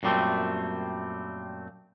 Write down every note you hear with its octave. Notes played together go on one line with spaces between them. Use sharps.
F#2 A#2 G3 A3 C4